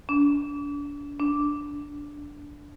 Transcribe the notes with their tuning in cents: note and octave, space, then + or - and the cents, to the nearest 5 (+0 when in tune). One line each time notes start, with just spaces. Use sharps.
D4 -35
D4 -10